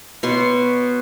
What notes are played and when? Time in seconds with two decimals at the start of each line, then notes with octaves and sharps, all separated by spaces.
0.23 B2 B4 C#5 C6